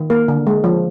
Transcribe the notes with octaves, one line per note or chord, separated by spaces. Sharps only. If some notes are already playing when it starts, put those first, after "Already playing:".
Already playing: D#3
A#3 A#4
D3
G#3
F3